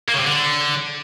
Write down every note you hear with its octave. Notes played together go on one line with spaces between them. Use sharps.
A#3
C#3
C3
D3